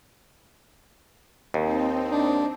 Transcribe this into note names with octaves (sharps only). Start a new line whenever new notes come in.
D#2 C4 D#4
D4